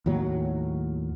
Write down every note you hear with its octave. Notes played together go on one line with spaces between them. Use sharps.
D#2 A2 F#3